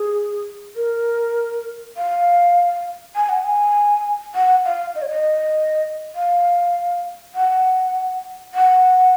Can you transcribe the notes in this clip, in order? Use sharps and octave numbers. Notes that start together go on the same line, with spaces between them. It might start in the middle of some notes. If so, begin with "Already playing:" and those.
Already playing: G#4
A#4
F5
G#5
F#5
G#5
F#5
F5
D#5
C#5
D#5
F5
F#5
F#5